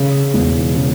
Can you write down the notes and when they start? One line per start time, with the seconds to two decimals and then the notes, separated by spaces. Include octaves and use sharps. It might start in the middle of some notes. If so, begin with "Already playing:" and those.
Already playing: C#3
0.34 E1
0.75 C#3